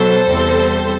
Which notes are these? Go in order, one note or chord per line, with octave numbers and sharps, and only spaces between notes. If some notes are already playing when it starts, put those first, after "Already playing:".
Already playing: B2 F#3 A4 C5
E2 C3 G3 C4